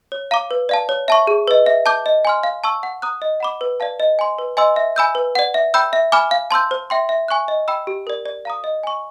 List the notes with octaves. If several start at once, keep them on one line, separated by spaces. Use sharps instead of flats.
C#5
F5 A#5 D6
B4
D5 F5 A5
C#5
E5 A5 C#6
G#4
B4 D#5
E5
A5 D6 G6
D#5
G#5 C6 F6
F5
A5 C#6 E6
F#5
A#5 D#6 F#6
D#5
F#5 B5 D6
B4
D5 F5 A5
D#5
G#5 C6
B4
D#5 G#5 C6 E6
E5
G#5 B5 E6 G6
B4
D5 F#5
E5
G5 B5 E6 G6
E5
G#5 B5 D6 F6
F5
A5 C6 E6 G6
C5
E5 G5 C6
E5
G#5 C#6 F#6
D#5
G5 B5 E6
G4
A#4 D5
D5
F5 A#5 D#6
D#5
G#5 C#6